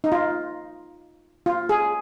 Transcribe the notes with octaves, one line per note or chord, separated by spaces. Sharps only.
D#4
F4
F4
G#4